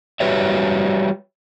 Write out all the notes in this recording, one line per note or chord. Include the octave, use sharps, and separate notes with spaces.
G3 F#4 G4 B4 C#5 E5